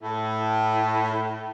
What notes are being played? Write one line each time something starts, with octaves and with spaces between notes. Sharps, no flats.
A2